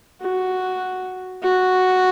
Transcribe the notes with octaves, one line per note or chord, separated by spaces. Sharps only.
F#4
F#4